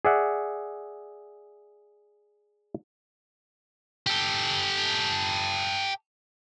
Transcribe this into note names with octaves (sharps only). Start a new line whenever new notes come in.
G#4 D5 E5 F#5
G4 A4